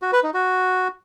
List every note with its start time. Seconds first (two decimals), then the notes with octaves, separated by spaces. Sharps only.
0.02 F#4
0.13 B4
0.23 D#4
0.34 F#4